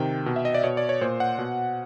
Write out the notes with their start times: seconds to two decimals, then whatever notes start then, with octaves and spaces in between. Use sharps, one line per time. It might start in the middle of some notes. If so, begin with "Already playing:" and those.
Already playing: C3 D#3 G5
0.26 B2
0.36 E5
0.45 D#5
0.54 D5
0.64 B2 C#5
0.77 D5
0.89 C#5
1.01 A#2 C5
1.20 F#5
1.38 B2